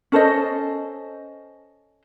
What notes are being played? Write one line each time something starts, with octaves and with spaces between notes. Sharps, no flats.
C#4 A4 C5 D#5